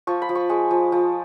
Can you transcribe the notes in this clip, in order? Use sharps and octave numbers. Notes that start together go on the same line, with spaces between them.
F3 C#6
B5
F3
C#6
G#3 C#6
F3
F3